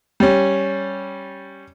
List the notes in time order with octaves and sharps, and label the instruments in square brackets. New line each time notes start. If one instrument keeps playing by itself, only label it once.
[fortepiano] G3 C#4